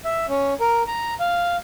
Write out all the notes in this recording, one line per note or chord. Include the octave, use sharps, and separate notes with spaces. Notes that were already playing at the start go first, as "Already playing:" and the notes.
E5
C#4
A#4
A#5
F5